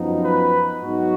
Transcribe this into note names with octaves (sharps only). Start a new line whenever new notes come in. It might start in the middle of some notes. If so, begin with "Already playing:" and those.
Already playing: F#2 F3 B3 D#4
B4
G#2 F#3 B3 D#4 F#4